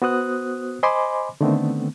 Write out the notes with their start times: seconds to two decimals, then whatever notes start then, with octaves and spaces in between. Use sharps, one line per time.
0.02 B3 F#4 C5 D#6 F#6
0.83 C5 D#5 G#5 B5 C6 D6
1.41 D3 D#3 A3 B3 C4